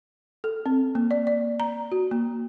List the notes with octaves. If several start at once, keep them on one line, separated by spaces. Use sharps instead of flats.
A4
C4
A#3
D5
D5
A#5
F#4
A#3